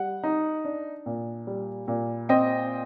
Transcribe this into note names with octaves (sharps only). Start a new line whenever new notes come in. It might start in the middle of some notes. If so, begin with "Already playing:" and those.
Already playing: G3 F#5
D#4
D4
A#2
G3
A#2
C4 D#5 G5